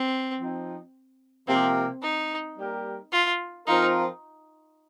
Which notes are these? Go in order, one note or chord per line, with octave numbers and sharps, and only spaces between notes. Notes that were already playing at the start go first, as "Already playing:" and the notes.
Already playing: C4
F3 C4 D#4
C3 F3 A#3 C4 G4 A#4
D#4
G3 A#3 G4 A#4
F4
F3 C4 D#4 F4 A#4